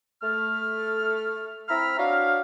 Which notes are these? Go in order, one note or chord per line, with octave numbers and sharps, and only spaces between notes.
A3 F6
C4 E4 A#5 B5 E6 F6
D4 F#4 C#5 F5